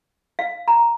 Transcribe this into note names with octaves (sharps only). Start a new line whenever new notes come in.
F5
A#5